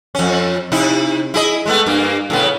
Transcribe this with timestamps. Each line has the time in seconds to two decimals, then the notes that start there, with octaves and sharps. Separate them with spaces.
0.15 F2 C#4
0.72 C3 D#4 E4
1.34 E4 G#4 D#5
1.66 G#3 A3 B3
1.86 G2 A#3
2.30 A2 C#3 B3